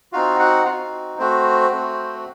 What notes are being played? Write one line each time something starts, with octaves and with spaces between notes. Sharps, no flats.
C4 D#4 F4 F#4 F5
F#4 F#5
C4 D#4 F4 F#4 F5
A3 C4 F#4 C5
A3 C4 F#4